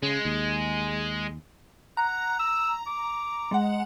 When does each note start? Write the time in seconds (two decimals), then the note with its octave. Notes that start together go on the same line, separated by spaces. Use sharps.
0.03 C#3 G#3
0.25 D#2
1.97 F#5 A#5
2.39 E6
2.87 D6
3.51 G#3 F#5